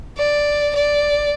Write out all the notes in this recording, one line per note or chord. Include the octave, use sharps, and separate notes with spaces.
D5
D5